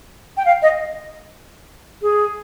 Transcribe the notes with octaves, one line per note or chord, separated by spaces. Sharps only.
G5
F5
D#5
G#4